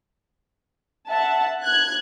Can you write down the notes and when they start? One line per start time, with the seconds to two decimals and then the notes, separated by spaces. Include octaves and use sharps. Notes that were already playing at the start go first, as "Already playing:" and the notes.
1.10 E5 F#5 A5
1.61 F#6 G#6